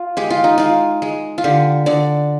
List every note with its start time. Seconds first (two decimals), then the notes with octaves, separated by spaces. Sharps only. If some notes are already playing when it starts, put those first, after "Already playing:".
Already playing: F4
0.17 G#3 G4
0.30 F4
0.44 D#4
0.58 G#3 F4
1.02 G#3
1.38 F4
1.44 D3 G4
1.86 D3 D5